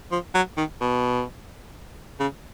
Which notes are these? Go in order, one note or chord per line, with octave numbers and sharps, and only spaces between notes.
F3
F#3
D#3
B2
C#3